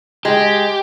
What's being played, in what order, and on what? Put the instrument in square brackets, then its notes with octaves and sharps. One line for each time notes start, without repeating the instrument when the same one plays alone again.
[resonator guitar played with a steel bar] G#3 [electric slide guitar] G4